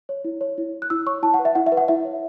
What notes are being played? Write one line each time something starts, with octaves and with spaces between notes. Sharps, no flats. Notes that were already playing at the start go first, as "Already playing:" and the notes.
C#5
E4
C#5
E4
C#5
F#6
E4 E6
C#5 C#6
E4 A5
F#5
B4
E5
E4 F#5
E5
B4
F#5
E4 E5
C#5